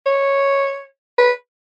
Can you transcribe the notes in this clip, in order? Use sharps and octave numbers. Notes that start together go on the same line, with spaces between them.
C#5
B4